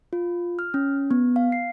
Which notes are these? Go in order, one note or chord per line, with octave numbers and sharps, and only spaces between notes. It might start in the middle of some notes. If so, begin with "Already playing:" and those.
F4
F6
C#4
B3
F5
C7